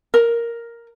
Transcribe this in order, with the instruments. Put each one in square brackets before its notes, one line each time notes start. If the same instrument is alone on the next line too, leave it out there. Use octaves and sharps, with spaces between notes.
[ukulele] A#4